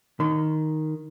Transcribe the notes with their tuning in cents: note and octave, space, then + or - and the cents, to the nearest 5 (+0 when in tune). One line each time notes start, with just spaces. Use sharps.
D#3 +0 C6 -45